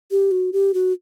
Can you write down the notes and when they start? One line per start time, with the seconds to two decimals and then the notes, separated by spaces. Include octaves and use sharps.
0.11 G4
0.31 F#4
0.53 G4
0.74 F#4